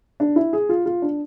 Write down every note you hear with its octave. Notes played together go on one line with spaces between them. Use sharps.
D4
E4
G#4
F4
F4
D4